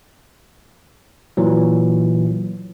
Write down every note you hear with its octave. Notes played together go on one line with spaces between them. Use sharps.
A#2 E3 F#3